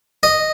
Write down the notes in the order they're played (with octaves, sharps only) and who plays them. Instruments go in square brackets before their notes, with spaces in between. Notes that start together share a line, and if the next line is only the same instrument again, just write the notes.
[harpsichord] D#5